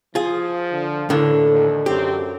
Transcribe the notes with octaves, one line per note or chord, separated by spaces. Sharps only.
F3 F4 G#4
D3
A2 D3 E3 A#3 A4
D#2
G#1 F#2 F#3 C4 G4